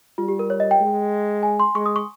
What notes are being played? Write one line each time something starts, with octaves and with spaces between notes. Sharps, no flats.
G3 F4
G4
A#4
C#5
D#5
G5
G#3
G#5
C6
G#3 C#6
D#6
C#6